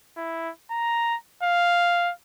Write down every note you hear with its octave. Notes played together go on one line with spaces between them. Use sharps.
E4
A#5
F5